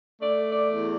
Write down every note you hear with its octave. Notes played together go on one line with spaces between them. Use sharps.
A3 D5
D5
E2